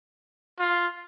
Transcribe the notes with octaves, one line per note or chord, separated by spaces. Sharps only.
F4